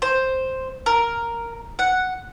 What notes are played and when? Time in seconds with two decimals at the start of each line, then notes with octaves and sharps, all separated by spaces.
0.02 C5
0.86 A#4
1.79 F#5